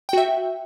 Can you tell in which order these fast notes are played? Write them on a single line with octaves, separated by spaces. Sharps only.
G5 F#4 E5